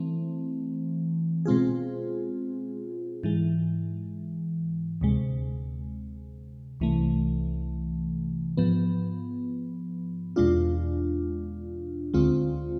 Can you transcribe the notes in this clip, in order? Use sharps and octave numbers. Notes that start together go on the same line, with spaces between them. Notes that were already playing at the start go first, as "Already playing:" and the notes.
Already playing: E3 A3 C4
B2 G#3 C4 F4 G#4
G#2 E3 G#3
D2 C3 G#3
C2 C3 E3 A3
G#2 F3 B3
E2 B2 G#3 D4 F4
D2 D3 G#3 C4 F4